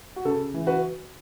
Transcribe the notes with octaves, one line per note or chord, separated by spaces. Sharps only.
F#4
C#3 A4
E3
F#4 B4